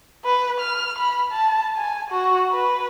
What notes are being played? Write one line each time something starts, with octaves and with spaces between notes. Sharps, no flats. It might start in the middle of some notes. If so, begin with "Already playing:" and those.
B4
F6
B5
A5
G#5
F#4
B4